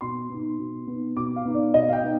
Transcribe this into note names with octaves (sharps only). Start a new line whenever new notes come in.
B2 C6
B3 D#4
B2
B3 D#4
B2 D6
F5
B3 D#4
D5
B2 D#5
F5
G5
B3 D#4